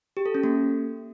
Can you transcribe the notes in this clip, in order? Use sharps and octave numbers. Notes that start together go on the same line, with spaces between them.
G4
A4
C#4
A#3